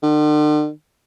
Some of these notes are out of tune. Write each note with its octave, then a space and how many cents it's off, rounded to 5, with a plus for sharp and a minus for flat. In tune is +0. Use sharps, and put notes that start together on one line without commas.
D3 +45